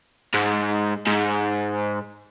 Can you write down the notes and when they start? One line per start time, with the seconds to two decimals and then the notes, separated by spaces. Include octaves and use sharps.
0.34 G#2
1.07 G#2